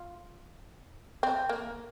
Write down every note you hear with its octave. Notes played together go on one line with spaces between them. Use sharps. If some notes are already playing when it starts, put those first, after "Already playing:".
Already playing: F4
C4
A#3